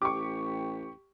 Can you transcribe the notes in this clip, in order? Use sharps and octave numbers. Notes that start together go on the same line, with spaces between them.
A1 G4 C#6 D6